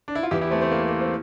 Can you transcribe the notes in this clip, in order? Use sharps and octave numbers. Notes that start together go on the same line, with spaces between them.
D4
E4
F4
E2 E3 E4 G4
E4 G4
A3 C4
A3 C4
A#3
C4
A#3
C4